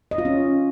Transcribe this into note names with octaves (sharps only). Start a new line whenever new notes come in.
D#5
F4
C#4